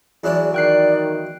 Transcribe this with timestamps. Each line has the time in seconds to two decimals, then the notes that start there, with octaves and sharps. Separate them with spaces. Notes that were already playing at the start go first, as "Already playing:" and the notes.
0.24 E2 F#3 D4 G#4
0.54 D#3 D5 G5 F#6 C7